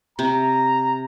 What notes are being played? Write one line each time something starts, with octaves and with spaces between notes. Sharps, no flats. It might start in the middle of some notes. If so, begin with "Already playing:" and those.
C3 A#5